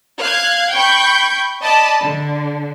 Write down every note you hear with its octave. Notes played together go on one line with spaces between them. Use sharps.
F5 F#6 G#6
G5 B5 C#6 G6
D5 D#5 A5 B5
D3